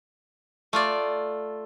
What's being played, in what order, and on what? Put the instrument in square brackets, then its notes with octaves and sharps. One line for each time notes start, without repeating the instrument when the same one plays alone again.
[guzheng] A3 F4 D5